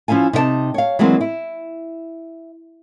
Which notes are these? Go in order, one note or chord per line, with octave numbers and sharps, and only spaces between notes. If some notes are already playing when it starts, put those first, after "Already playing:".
F3 C#4 E4 F5 G#5
C3 D#4 C#5 A5
C#5 F5
E3 F#3 G#3 A#3 C4
E4